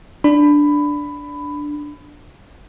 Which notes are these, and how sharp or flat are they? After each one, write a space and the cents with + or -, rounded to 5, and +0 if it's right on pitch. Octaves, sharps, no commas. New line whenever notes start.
D4 +0 B5 +15